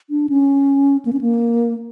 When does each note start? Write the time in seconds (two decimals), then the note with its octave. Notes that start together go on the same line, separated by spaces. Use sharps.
0.10 D4
0.29 C#4
1.05 A#3
1.13 C#4
1.21 A#3